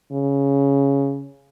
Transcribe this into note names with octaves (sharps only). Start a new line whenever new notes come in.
C#3